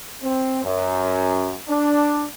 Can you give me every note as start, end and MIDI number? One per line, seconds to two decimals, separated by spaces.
0.23 0.63 60
0.63 1.53 42
1.69 2.25 62